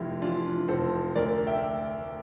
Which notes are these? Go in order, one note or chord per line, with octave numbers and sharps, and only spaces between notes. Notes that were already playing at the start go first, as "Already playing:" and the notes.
Already playing: F1 F2 E4 F4 G4
E3 D4 F4
F1 A4 C5
D2 A#4 D5
E5 G5